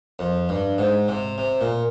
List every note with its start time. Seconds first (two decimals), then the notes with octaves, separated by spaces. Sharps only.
0.19 F2
0.49 G2
0.78 G#2
1.08 C3
1.38 C3
1.61 A#2